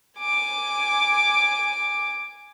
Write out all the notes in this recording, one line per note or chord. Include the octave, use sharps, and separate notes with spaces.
G#5 D6